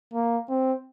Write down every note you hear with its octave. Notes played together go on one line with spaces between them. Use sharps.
A#3
C4